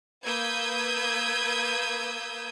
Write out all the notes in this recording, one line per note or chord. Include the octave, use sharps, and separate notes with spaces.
A#3 B4 D#6 E6 G6 G#6